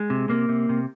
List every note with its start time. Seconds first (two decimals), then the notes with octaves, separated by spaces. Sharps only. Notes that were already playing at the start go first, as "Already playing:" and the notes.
Already playing: G#3
0.10 C3
0.29 C3 A#3
0.49 C3
0.69 C3